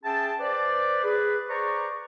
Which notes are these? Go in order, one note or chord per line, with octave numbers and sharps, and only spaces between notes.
C#4 G#4 E5 G5 A5
B4 C5 D5
G#4 B4
G#4 B4 C5 D5 A#5 C#6